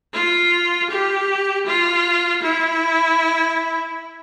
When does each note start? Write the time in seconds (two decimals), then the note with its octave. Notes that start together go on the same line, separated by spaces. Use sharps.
0.13 F4
0.90 G4
1.66 F4
2.43 E4